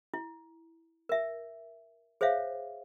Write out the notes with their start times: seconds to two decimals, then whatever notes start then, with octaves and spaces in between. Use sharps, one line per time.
0.14 E4
1.09 A#4 E5
2.21 G#4 C5 C#5 E5 F5